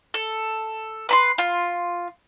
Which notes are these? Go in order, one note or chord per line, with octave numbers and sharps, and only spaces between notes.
A4
B4 B5 C6
F4